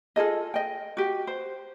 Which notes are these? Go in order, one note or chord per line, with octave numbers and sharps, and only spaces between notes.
F4 G#4 A4 D#5
D#5 G5
F#4 G4
C5